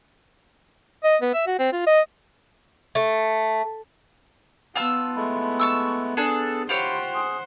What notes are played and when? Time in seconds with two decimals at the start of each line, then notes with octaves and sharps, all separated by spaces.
1.04 D#5
1.22 B3
1.34 E5
1.47 F#4
1.59 C4
1.73 F4
1.86 D#5
2.95 A3
4.76 B3 F4 A5 E6
5.16 G#3 A3 E4
5.60 A5 C#6 E6
6.17 D4 G#4 A4
6.69 E4 F4 G4 C5 C#5 F#5
7.14 G#4